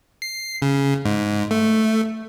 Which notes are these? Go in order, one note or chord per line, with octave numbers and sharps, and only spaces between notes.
C7
C#3
G#2
A3